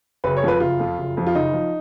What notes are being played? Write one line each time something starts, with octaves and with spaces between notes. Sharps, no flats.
F#1 B4
C#5
F2 F3 B4
F#1 F4
F2 F3
F#1
F2 F3
F4
F#1 D#4
F3